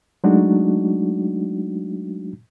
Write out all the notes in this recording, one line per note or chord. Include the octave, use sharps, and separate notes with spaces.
F#3 G#3 A3 D4 D#4 F#4